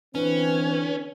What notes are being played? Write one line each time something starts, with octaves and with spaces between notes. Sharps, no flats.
D3 E3 C4 C#4 B4